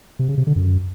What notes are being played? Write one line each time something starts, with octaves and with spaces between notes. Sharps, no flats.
C3
C#3
C3
D3
F#2